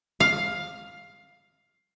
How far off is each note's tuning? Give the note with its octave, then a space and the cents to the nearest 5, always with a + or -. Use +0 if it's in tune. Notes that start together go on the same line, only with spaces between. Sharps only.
F5 +10